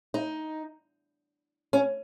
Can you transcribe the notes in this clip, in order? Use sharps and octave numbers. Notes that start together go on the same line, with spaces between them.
D#4
C#4